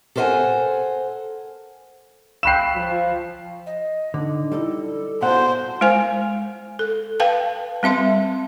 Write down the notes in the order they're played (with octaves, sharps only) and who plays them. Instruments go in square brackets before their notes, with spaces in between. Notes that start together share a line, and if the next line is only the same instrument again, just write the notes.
[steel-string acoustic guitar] A4 A#4 C5 E5 F#5 G#5
[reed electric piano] F5 C#6 F#6 [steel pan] G5 B5 E6 [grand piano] C7 E7
[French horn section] F3
[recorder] D#5
[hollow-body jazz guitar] D3 [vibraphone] D4 D#4
[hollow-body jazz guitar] G3 [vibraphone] E4 D5 [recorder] A4
[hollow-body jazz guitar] B2 F#5 [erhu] C5 [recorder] A5
[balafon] G#3 C5 G#5
A4
B4 F5 G5 A5
G3 C4 E5 C6